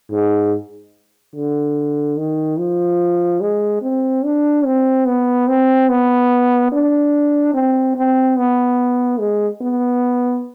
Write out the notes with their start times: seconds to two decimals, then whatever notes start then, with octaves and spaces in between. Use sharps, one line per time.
0.11 G#2
1.35 D3
2.17 D#3
2.59 F3
3.41 G#3
3.82 C4
4.24 D4
4.65 C4
5.06 B3
5.48 C4
5.89 B3
6.72 D4
7.54 C4
7.96 C4
8.37 B3
9.19 G#3
9.61 B3